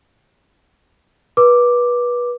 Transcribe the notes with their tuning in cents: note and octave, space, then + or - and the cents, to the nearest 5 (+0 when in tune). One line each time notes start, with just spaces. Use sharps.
B4 -25 D6 +0